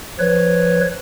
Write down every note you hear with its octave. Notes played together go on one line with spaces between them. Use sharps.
F3 B4 C#5